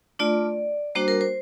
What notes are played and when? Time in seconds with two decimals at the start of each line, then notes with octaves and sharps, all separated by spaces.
0.19 A3 D4 F4 D5
0.95 G3 A#3 D4 F#4 C5
1.08 A#4
1.21 C5